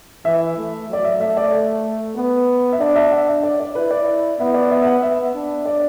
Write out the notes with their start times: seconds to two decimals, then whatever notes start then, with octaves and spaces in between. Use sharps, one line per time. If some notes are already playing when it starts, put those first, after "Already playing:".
0.25 E3 E5
0.57 A3
0.89 F#3 D5
1.05 E5
1.20 A3 E5
1.37 D5
1.52 A4
2.16 B3 B4
2.72 E5
2.79 D4 D5
2.96 E5
3.12 F#5
3.28 E5
3.43 D5
3.60 D5
3.75 E4 B4
3.91 D5
4.39 B3 E5
4.54 D5
4.71 E5
4.82 E5
4.87 F#5
5.02 B3 E5
5.35 D4
5.65 D5